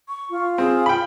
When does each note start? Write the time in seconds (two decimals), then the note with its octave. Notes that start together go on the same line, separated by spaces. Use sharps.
0.08 C#6
0.30 F4
0.58 C4 G#4
0.86 G5 B5